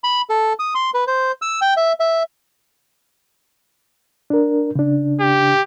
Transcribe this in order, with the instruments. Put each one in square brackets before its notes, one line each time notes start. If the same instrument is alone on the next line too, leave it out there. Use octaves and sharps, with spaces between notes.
[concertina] B5
A4
D#6
C6
B4
C5
E6
G5
E5
E5
[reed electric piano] D4 A#4
C#3 D4
[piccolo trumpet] G4